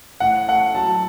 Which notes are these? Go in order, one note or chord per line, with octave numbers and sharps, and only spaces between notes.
A2 F#5
A3 F#5
F#3 A5